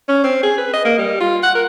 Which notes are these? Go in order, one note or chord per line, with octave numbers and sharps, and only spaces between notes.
C#4
C4
G#4
B4
D#5
A#3
G3
F4
F#5
A#4